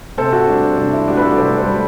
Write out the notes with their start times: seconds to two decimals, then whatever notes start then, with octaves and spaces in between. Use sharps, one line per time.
0.17 C3 A4 C5
0.32 F#4 A4
0.48 G3 D4
0.63 C4
0.77 C3 D4
0.93 C4 E4
1.07 G3 D4 F#4
1.17 B4
1.22 F#4 A4
1.31 D5
1.37 C3 A4 C5
1.58 A4 C5
1.67 G3